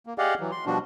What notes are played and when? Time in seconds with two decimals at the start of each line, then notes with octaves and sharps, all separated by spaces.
0.06 A#3
0.18 G4 G#4 D5 D#5 F5 F#5
0.40 E3 F#3
0.51 C6
0.66 B2 F3 G3 D4 F#4